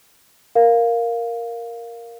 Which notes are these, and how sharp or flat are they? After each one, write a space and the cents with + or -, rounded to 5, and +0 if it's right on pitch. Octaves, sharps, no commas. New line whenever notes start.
A#4 +0 F5 +0